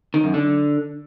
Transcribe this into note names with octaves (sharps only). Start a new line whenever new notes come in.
D#3
F#2
D3